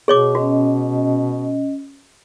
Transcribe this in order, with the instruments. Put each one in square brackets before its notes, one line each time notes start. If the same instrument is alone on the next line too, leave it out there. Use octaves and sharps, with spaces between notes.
[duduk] B2 [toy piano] G#4 C#5 D6
[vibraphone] C#4 D#5 [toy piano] F#4